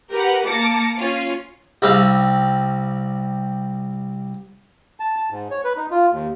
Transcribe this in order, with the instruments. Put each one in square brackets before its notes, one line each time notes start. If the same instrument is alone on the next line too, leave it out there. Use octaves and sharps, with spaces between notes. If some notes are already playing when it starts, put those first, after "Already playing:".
[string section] G4 A#4 B4 F#5
A#3 A5 D6 A#6 C#7
C#4 F4
[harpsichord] C2 G3 C4 E5 F5 G5
[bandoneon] A5
A5
G#2
C#5
B4
D#4
F4
D#2